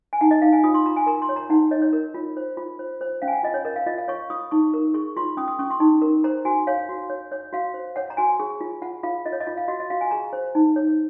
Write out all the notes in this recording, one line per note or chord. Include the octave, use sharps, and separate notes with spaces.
G#5
D#4 F#5
D#5
D#4 F5
G#5
F4 D#6
C6
F4 A#5
G#5
A#4 A#5
C6
C#5
A#5
D#4 F#5
C#5 D#5
C#5
A#4
F4
C5
F4
C5
C5
C#4 F5
G#5
F#5
F4 D#5
C#5
A#4 D#5
F5
F4 D#5
F5
C#5 C#6
F4 D#6
D#4 C#6
A#4
G#4 C#6
F4 C6
C#4 D#6
D#6
C#4 C#6
C6
D#4
A#4
C5 A#5
F#4 G#5
C#5 F5
F#4
C#5
C#5
F#4 F5
C5
C#5 F#5
A#5
F#4 G#5
G#4
F4
F4 F#5
F4 F5
F4 D#5
C#5
D#5
F4
F5
F#4 D#5
D#5
F#4 F5
G#5
G#4 A#5
C5
D#4
C#5